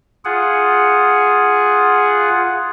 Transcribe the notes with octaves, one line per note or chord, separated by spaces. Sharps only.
F4 G#4 F#5